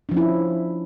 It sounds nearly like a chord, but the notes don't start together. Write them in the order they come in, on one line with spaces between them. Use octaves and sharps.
D4 F3 C#4 E4